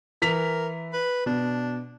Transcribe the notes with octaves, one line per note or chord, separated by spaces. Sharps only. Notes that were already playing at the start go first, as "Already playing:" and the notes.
E3 A#4 B6 F7
B4
B2 D4